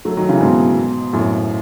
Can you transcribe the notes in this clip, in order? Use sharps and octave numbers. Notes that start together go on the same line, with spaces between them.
F#3 A3
D#3 F#3
C#3 E3
G#2 B2
F#2 A2